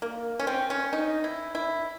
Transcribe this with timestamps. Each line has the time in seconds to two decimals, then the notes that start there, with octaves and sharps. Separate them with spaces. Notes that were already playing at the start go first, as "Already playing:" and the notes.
0.02 A#3
0.40 C#4
0.47 C4
0.70 C#4
0.93 D#4
1.24 E4
1.55 E4